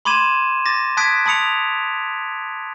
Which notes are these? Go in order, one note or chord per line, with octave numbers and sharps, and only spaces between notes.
B5 C6 D6 G#6 D#7 E7
D6 A6 A#6
A5 D#6 F#6 G#6 B6 D7
A5 B5 D#6 C#7 F7